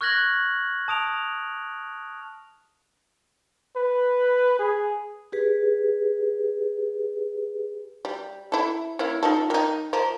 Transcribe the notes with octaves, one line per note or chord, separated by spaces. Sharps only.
C#6 F6 F#6 G#6 A#6 F#7
A5 D#6 D7 F7
B4
G#4
G4 G#4 B4
G3
E4 A4
A#3 C#4 E4
D#4 F4 A4
D#3 D#4
F3 A#4